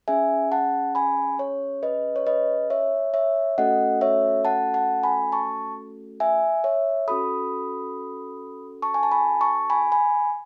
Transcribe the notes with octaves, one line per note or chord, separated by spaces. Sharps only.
C#4 G#4 E5 G#5
F#5 A5
G#5 B5
C#5
B4 D#5
C#5
B4 D#5
C#5 E5
C#5 E5
A3 C#4 F#4 A4 D#5 F#5
C#5 E5
F#5 A5
F#5 A5
G#5 B5
A5 C#6
E5 G#5
C#5 E5
C#4 F#4 A4 B5 D#6
A5 C#6
G#5
A5
G#5 B5
A5 C#6
G#5 B5
G#5 B5